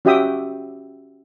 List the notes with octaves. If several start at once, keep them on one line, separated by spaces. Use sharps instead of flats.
C#4 F#4 G4 E5 G5 D#6